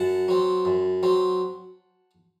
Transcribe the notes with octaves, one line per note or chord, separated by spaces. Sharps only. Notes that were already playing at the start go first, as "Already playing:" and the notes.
Already playing: F#2 F#5 A5
F#3 C4
F#2
F#3 C4